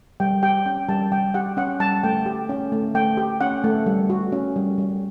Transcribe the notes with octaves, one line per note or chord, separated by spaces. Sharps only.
G3 G5
G4 G5
C#4 G5
G3 A5
G3 G5
G4 F#5
C#4 F#5
G3 A5
A3 G5
G4
C#4
A3
A3 G5
G4
C#4 F#5
A3
G3
F#4
C#4
G3
G3